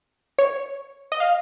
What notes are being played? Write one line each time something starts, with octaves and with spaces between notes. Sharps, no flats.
C#5
D#5
F5